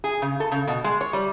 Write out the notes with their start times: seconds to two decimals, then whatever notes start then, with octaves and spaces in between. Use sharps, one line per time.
0.04 G#4
0.22 C#3
0.40 A4
0.52 C#3
0.68 B2
0.84 G#3
1.01 C#5
1.13 G3